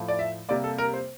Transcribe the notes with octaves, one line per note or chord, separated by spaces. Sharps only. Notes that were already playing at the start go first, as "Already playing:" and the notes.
Already playing: A2 F3 A3
D5
E5
C3 G3 A#3 D5
A4
A#4
C5